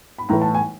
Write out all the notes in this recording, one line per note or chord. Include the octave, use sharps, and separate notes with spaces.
B5
A2 E3 A3 A#5
A5
G#5